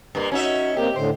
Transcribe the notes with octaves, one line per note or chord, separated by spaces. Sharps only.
G2 A#3
C#4 D#4 F#4 E5
A#3 C4 G4 A#4
A2 D3 C5